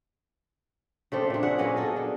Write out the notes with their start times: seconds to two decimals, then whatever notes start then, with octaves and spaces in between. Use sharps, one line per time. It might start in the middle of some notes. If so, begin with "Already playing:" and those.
1.12 C#3 A3 C4 D5
1.30 A#2 D4
1.43 G#4 E5 F#5
1.58 F#3 A#3 B3 C#4
1.76 G#4 A4 D#5
1.96 D4